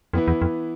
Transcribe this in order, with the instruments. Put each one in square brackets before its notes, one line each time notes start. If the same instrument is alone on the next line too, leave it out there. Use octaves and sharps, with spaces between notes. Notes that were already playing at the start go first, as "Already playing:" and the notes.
[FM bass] F2 [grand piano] E3 B3 E4
[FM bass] E2
F2